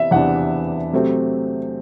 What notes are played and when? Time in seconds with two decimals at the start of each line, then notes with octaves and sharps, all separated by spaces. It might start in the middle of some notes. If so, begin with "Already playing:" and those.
Already playing: C3 E3 B3 E5
0.11 E2 C3 E3 B3 D4 F#5
0.92 C3 F#3 A3 C4